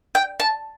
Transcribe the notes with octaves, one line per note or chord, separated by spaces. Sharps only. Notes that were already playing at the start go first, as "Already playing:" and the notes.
G5
A5